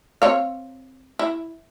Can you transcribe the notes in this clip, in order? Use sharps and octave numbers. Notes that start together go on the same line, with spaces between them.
C4 C#5 F5
E4